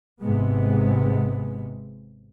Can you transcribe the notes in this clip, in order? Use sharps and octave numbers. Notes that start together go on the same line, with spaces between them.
G#1 G#2 C3 G#3 B3